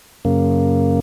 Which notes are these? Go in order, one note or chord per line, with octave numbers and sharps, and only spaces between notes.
F#2 C#3 A#3